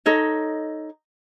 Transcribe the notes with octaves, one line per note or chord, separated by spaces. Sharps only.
D#4 A4 C#5 D#5